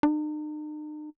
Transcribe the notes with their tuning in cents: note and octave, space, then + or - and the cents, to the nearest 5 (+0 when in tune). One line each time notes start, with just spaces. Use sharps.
D#4 -45